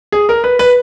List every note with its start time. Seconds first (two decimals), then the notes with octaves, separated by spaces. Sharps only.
0.12 G#4
0.29 A#4
0.44 B4
0.59 B4